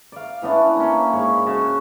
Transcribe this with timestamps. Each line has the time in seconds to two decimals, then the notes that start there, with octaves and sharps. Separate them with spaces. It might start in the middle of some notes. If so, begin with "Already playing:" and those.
0.12 D5 F5
0.42 E3 B3 C#4 D4
0.60 E4
0.77 A#3 C#4
1.13 G#2 C#5 B5
1.46 C#3 F#4 A5 C#6